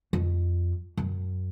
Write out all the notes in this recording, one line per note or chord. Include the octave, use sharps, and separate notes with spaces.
F2
F#2